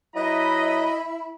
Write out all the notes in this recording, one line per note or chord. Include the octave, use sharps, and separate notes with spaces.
F#3 E4 B4 D#5 B5